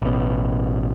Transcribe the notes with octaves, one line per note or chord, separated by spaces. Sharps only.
A1 B2